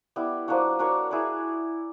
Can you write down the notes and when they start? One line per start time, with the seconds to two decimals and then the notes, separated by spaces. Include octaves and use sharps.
0.16 G3 B3 E4
0.48 F3 A#3 D4 F#4
0.79 D4 F#4 A#4 C#5
1.11 E4 G#4 B4 D5